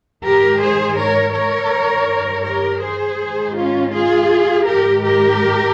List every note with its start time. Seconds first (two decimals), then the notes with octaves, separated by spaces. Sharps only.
0.23 G#2 D#3 G4 A#4
0.60 G#4 C5
0.97 A#4 C#5
1.34 A#4 C#5
1.71 G2 D#3
2.45 G4 A#4
2.81 G#4 C5
3.19 G#2 D#3
3.56 C#4 F4
3.92 F4 G#4
4.66 G#2 D#3 G4 A#4
5.04 G4 A#4